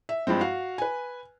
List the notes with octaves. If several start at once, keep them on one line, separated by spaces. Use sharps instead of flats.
E5
G2 F3 G#3 C4
F#4 F5
B4 G#5